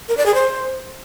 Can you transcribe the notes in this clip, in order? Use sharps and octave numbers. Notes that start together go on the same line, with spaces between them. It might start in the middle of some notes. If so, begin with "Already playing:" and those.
A#4
D5
G#4
C5